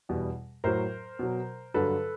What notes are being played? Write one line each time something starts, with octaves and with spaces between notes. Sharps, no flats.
E2 B2 G3
A2 F#3 A#4 C5
B2 F#3
G2 D3 F#3 A4 B4